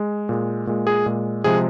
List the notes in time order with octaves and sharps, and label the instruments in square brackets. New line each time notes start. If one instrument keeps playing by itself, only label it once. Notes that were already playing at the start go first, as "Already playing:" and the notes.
Already playing: [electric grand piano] G#3
A#2 G#3
A#2 G#3
G#4
A#2 G#3
C3 F3 G#3 G#4